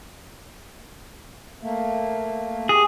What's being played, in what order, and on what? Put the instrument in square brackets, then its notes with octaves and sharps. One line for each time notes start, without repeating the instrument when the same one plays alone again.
[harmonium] A3 A#3
[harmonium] G4 [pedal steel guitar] G#4